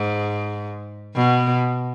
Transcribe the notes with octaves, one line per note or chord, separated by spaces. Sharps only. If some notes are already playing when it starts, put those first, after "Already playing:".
Already playing: G#2
B2